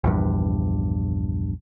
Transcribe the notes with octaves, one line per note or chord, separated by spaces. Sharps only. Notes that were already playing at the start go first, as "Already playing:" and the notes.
A#1 E2 G2